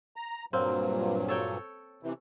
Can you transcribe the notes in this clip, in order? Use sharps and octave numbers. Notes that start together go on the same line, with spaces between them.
A#5
G2 A#2 F#3 A#3 C4
A4 C#5 G5
C3 E3